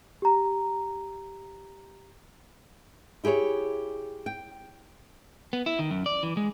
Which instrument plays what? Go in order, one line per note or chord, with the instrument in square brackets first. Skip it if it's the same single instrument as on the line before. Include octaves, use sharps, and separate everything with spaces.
[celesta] G4 A#5
[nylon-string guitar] E4 G4 G#4 B4 C#5
G5
[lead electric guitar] B3
E4
D#3
F#2
D5
E3
G#3